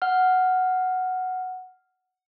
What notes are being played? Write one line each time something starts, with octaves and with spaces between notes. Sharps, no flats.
F#5 F6